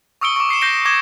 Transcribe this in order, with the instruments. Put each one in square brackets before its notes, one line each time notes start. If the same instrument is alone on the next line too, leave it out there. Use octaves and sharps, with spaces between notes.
[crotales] C#6 D#6 E6 C#7 D7 G7
C#6 D6
D#6 C7 C#7 E7
G6 A#6 C7 D7 G7
D6 G#6 A#6 E7 G7